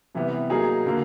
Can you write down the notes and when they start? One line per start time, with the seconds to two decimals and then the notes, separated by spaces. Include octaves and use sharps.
0.15 C3 E3 G3 B3
0.50 F#3 A#3 D#4 G#4
0.86 D3 F#3 A#3